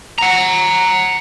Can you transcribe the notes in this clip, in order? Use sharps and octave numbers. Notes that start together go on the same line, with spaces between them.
F#5 A#5